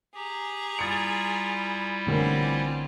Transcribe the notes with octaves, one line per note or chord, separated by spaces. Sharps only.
G4 G#4 A#5
G3 E4 F4 D#6 A6 C#7
A1 D3 C4 G4 G#4 A#4